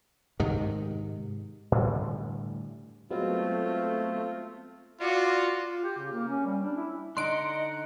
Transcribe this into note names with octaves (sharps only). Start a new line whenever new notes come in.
G#2 C3 D#3
A2 D3 E3 G3
F#3 G#3 A3 B3 C4 F4
F4 F#4 D5
F4
G4
C#3
A#3
C#4
G3
D4
E4
D3 D4 D#4 D#5 F#5 C6 D7